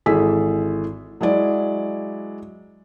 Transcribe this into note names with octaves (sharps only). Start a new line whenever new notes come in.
G#1 E3 G#4 A4 E6 B6
F#3 G#3 E4 D5